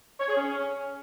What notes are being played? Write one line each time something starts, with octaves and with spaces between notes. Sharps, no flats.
C#5
G#4
C#4